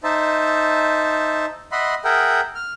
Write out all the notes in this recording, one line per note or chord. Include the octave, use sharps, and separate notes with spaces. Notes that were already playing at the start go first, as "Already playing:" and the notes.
D#4 C5 E5 A5
D#5 E5 F#5 B5 C6
G#4 A#4 E5 F#5 G5
F6